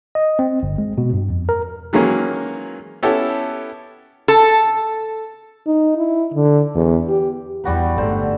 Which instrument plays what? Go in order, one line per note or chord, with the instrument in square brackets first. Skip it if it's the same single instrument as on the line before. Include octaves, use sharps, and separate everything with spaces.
[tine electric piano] D#5
C4
G1
G#3
B2
G2
F2
A#4
[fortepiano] D#3 E3 F#3 G#3 A#3 C#4
B3 C#4 E4 G4 A4
[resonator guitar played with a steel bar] A4
[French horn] D#4
E4
D3
E2
G4
[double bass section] E2 [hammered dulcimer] G3 F#4 B4
[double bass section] G1 G#2 A3 [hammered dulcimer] D3 C5